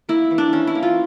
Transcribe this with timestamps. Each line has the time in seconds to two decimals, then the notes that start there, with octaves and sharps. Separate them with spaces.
0.09 A#3 E4
0.31 E3
0.38 D4
0.53 E3 C#4
0.67 E4
0.75 A#3
0.83 F4